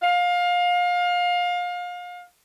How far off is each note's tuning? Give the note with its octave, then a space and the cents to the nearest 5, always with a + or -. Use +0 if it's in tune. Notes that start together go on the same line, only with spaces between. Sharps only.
F5 +25